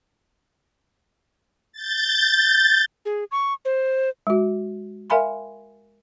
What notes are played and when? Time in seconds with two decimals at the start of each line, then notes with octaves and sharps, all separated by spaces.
1.72 G6 A6
3.06 G#4
3.31 C#6
3.65 C5
4.27 G#3 F#4
5.10 A#4 E5 F5 G#5 B5 C6